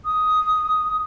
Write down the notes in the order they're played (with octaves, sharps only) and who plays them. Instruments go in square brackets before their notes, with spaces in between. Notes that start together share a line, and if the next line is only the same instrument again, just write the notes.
[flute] D#6